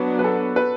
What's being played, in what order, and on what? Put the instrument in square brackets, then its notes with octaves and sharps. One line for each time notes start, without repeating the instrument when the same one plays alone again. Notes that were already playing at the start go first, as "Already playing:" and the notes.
Already playing: [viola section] F#3 B3 D4 [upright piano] B4
[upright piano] B4
A4
B4